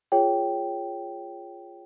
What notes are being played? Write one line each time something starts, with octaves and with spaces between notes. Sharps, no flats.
F4 G#4 C#5 G5